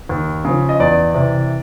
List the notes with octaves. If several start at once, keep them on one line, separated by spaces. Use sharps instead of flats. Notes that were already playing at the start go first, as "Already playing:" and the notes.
D#2
C#3 F3
D#5
E2 D5
C3 E3